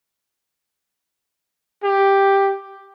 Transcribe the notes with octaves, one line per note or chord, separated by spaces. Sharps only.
G4